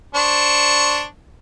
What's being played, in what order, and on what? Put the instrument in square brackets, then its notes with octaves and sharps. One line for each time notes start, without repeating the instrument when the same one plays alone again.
[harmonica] D4 C5 C#6